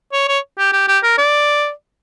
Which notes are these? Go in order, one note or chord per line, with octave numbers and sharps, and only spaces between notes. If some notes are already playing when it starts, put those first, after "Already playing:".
C#5
C#5
G4
G4
G4
A#4
D5